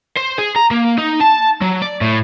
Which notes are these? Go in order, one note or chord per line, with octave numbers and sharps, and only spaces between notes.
C5
G#4
A#5
A#3
D#4
A5
F#3
D5
A2